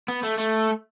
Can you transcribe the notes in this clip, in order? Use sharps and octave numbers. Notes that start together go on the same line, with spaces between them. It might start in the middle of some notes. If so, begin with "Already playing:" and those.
B3
A3
A3